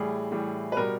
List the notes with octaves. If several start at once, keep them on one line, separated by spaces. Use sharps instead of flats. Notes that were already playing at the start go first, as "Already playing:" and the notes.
Already playing: A2 E3 G3 G#4
A2 E3 G3
B4
B2 G3 A#4